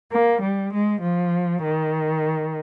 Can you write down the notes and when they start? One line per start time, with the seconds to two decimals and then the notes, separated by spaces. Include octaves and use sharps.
0.12 A#3
0.42 G3
0.73 G#3
1.02 F3
1.64 D#3